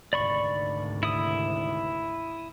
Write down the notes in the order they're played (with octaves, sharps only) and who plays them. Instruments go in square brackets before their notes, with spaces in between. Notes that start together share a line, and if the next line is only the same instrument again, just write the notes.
[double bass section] G#1 D2 C3 [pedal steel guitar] D5 B5 C#6
[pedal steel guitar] E4 D#6